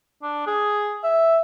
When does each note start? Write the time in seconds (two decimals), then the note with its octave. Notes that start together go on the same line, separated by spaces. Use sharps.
0.23 D4
0.47 G#4
1.03 E5